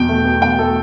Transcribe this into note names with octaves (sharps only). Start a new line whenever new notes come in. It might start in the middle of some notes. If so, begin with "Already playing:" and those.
Already playing: E2 B2 G5
A3
B2
E2 G5
A3 A4